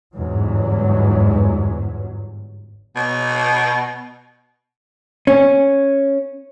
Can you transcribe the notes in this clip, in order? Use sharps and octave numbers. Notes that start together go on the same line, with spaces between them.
G1 E2 G#2 F#3
B2
C#4